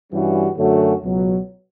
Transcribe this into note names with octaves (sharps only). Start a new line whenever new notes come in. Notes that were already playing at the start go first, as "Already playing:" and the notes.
G2 E3 G3 C#4 F#4
F#2 D3 A3 C#4 F#4
C#2 B2 F#3